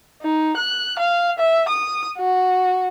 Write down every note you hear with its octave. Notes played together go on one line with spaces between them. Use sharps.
D#4
F#6
F5
E5
D#6
F#4